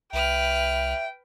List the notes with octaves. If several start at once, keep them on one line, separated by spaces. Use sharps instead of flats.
C2 B4 E5 G5 F6